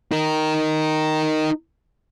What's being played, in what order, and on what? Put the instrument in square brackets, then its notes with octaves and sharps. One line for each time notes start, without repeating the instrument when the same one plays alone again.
[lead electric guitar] D#4 A#4